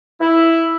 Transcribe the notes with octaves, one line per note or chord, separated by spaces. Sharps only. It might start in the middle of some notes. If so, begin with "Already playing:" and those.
E4